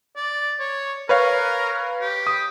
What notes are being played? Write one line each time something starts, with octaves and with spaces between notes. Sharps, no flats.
D5
C#5
A#4 B4 C#5 F5
G4
D#6